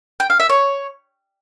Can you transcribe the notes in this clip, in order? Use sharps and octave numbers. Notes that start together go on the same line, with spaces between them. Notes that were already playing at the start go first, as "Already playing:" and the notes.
G5
F5
E5
C#5